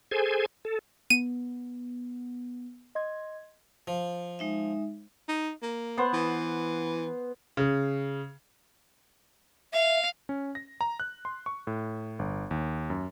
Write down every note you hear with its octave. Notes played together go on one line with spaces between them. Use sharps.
G#4 A4 C5 G#5
A4
B3 D#7
D#5 C6 G#6
F3
G#3 D#4 E5
D#4
A#3
B3 C5 F#5
E3
C#3
E5 F5
C#4
A#6
A#5
F#6
C6
C#6
A2
G1
D#2
F#2